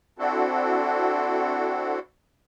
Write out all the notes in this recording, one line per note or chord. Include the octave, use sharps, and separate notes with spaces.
C4 D4 E4 F#4 A4